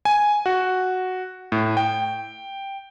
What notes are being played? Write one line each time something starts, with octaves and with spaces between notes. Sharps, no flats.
G#5
F#4
A2
G5